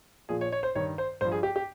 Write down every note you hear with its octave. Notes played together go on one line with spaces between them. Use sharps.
A#2 F3 G#4
C#5
C#5
C5
G2 D#3 C#5
C5
G2 F3 C5
G#4
G4
G4